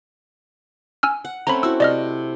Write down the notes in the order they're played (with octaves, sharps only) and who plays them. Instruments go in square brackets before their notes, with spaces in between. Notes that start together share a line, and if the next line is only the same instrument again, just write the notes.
[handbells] G#5 E6 F6
[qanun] F#5
[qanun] A3 C4 C#4 [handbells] A#5 B5
[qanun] E4 F#4 [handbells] E6
[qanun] C3 [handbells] D5 D#5 F6